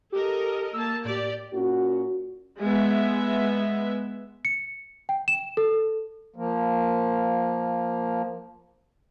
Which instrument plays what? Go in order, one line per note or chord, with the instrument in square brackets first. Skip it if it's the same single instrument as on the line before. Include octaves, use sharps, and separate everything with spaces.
[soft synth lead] G4 [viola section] A4 A#4 D#5
[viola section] A#3 A5 [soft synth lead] E6
[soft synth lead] A2 [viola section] G4 D5
[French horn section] A#2 C#4 F#4
[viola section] G#3 B3 E5
[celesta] C#7
G5
E7
A4
[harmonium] F3 A#3